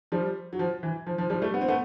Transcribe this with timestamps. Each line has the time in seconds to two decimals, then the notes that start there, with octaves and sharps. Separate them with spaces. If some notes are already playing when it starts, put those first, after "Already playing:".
0.12 F3 G3
0.53 F#3
0.59 F3
0.83 E3
1.07 F3
1.18 F3
1.30 F3 G3
1.42 G3 A3
1.54 B3
1.61 C4
1.68 A3 B3